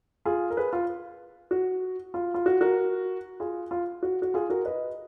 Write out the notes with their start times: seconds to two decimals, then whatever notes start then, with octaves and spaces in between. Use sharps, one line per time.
0.25 F4 G#4
0.50 A#4
0.57 G#4 B4
0.73 F4
1.51 F#4
2.14 F4
2.34 F4
2.46 F#4
2.61 F#4 A#4
3.40 F4 G#4
3.71 F4
4.03 F#4
4.22 F#4
4.34 F4 G#4
4.50 F#4 A#4
4.65 B4 D#5